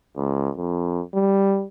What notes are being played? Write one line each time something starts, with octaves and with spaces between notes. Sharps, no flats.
C#2
F2
G3